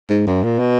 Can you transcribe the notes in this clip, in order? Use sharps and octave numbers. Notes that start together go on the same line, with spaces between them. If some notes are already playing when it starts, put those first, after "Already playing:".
G#2
F#2
A#2
B2